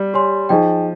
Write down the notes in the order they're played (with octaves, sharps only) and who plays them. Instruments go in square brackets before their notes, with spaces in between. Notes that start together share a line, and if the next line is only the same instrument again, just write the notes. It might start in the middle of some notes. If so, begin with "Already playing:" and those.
Already playing: [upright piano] G3
[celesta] G4 C#5 G#5 C6
[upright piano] F3 [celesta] D#4 G#4 D#5 G5